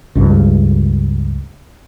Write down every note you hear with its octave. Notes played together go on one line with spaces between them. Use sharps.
C#2 G2